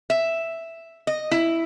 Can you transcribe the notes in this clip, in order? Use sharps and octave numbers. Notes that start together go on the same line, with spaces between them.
E5
D#5
E4